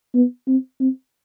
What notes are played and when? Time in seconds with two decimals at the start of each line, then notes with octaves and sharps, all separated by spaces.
0.14 B3
0.47 C4
0.80 C4